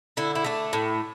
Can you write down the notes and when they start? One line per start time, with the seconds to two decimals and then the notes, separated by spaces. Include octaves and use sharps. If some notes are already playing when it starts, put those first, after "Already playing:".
0.17 D3 E4
0.35 E4
0.44 A3 D4
0.73 A2